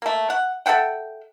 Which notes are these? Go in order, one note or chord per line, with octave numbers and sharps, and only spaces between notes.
A3 A#3
F#5
A4 E5 F#5 G5